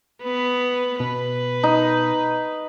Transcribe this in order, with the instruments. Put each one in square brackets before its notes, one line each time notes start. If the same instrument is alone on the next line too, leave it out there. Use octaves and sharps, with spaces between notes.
[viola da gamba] B3 B4
[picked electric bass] B2 [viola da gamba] B4
[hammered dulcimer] D#4